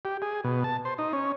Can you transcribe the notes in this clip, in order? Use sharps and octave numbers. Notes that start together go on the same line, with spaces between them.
G4
G#4
B2
A5
C5
D#4
C#4